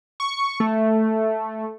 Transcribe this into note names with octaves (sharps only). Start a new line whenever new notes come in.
C#6
A3